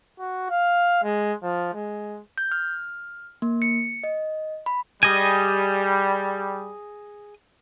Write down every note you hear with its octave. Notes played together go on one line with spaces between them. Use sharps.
F#4
F5
G#3
F3
G#3
G6
F6
A#3
C#7
D#5
B5
G3 G#4 D#5 G#5